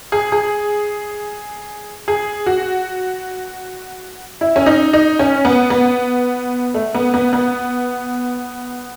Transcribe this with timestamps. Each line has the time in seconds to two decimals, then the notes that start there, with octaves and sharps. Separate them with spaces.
0.12 G#4
0.32 G#4
2.08 G#4
2.46 F#4
4.41 E4
4.56 C#4
4.66 D#4
4.93 D#4
5.19 C#4
5.45 B3
5.70 B3
6.74 A3
6.94 B3
7.14 B3
7.33 B3